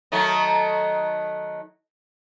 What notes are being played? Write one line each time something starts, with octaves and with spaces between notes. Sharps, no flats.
D#3 F#3 A3